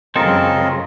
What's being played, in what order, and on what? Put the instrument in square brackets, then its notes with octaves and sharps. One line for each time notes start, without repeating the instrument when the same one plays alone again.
[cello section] F#2 C#3 [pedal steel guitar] G#3 C4 A4 [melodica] F4 A#4 D#5